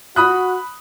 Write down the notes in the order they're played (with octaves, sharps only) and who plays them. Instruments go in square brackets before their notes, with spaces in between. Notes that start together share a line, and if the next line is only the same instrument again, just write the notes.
[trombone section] F#4 [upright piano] B5 D#6 F#6